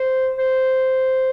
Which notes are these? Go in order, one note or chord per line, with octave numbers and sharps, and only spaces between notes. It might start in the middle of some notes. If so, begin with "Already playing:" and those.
Already playing: C5
C5